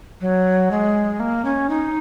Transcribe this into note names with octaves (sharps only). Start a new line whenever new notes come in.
F#3
G#3
A#3
C#4
D#4